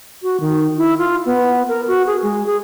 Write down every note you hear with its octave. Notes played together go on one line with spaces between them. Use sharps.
F#4
D#3
E4
F4
B3
A#4
F#4
G#4
G#3
G#4